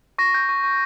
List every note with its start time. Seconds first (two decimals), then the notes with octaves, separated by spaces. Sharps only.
0.18 C#6 A#6
0.34 G6
0.49 C#6
0.64 C#6